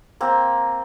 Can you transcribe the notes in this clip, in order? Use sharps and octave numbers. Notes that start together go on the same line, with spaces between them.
A#3 C4